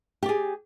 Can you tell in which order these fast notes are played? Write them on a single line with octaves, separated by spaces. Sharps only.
G4 D5 G#4